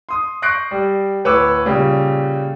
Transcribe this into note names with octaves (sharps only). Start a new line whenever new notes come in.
C6 D#6
C#6 F#6 G6 A#6 C7 D7
G3
D1 B4 C#5 D6 E6
A#2 C#3 G3